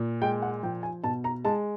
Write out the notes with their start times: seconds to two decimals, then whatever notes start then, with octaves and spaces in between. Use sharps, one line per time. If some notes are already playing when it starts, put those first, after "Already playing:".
Already playing: A#2
0.22 G#3 G5
0.42 F#5
0.63 F3 G5
0.83 G#5
1.04 B2 A5
1.24 A#5
1.45 G#3 A5